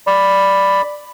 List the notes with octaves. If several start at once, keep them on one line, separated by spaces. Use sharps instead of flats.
D5 B5